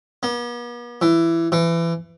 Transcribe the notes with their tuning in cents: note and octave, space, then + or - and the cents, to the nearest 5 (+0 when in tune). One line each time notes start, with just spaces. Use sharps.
B3 -45
E3 +15
E3 +25